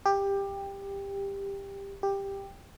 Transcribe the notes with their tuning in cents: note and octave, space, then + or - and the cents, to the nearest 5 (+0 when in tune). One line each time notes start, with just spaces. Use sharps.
G4 +15
G4 +10